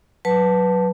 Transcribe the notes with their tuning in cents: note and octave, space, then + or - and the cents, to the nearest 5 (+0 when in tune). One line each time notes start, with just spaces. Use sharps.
F#3 +0 B4 +0 A5 +0